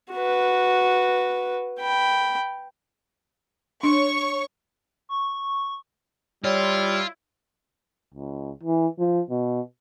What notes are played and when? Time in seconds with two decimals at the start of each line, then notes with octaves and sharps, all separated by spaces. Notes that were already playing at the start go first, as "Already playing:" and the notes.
0.12 F#4 B4
1.80 G5 B5
3.83 D4 C#5 C#6
5.09 C#6
6.44 G3 E4 F4 C#5 D5 G5
8.14 C#2
8.63 E3
8.99 F3
9.30 B2